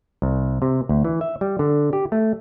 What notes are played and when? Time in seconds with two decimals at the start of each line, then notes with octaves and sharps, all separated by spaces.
0.22 C2
0.62 C3
0.89 D2
1.04 E3
1.21 E5
1.41 G3
1.59 D3
1.93 G4
2.12 A3